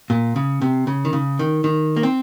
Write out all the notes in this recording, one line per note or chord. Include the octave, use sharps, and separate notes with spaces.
A#2
C#3
C3
C#3
D#3
C#3
D#3
D#3
A#3
C4